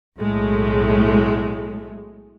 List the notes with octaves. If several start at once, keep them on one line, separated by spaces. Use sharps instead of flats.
B1 A2 G#3 A3